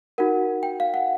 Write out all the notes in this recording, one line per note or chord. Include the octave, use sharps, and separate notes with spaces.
D#4 F#4 A#4 F#5
G5
F5
F#5